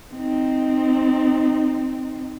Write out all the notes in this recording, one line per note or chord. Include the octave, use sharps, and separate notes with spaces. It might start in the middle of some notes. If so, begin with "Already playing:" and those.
C4 D#4